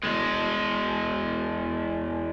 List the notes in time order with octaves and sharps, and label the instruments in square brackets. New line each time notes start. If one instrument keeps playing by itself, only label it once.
[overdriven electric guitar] E2 G#3